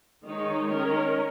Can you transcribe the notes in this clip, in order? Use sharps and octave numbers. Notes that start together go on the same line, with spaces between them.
D#3 G#3 D#4 C#5
D#3 C#4 A#4 C#5